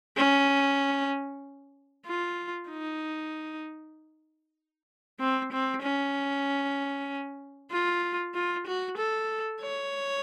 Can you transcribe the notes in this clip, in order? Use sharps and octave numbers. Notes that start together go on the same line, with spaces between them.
C#4
F4
D#4
C4
C4
C#4
F4
F4
F#4
A4
C#5